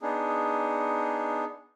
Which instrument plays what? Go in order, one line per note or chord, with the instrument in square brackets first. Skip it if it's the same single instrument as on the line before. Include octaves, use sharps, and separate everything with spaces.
[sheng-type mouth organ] B3 D4 D#4 G#4